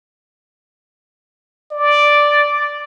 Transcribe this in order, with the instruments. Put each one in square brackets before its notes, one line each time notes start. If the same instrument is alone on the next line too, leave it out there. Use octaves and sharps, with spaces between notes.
[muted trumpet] D5